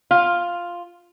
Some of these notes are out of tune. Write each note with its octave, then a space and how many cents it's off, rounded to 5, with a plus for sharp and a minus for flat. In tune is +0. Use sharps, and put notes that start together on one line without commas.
F4 +0 F5 +0